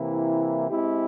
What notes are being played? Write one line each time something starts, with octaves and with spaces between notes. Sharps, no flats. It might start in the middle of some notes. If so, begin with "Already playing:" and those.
Already playing: C3 E3 A#3 E4
G#3 C4 E4 G4